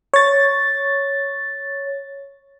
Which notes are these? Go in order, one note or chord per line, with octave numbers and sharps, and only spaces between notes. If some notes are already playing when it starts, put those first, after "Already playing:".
C#5 A6